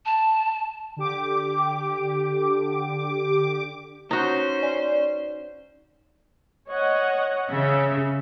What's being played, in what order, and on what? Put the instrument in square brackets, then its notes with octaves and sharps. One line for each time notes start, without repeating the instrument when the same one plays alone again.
[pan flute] A5
[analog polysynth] D3 G4 D6
[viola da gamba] C#4 C5 [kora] D#4 F#4
[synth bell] D5
[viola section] C#5 D#5 F#5
[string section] C#3 [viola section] E5